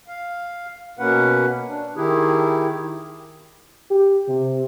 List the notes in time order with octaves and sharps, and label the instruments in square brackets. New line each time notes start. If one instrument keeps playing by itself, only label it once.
[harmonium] F5
B2 A#3 C#4 B4 F#5
D4
D#3 E4 G4 G#4
[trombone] G4
C3